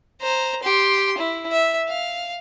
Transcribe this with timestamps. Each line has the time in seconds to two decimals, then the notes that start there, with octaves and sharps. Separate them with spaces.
0.21 C5 A#5
0.63 G4 C6
1.17 E4
1.52 E5
1.89 F5